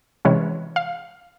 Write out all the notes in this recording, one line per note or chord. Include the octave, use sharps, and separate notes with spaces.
C3 E3 G#3 C#4
F5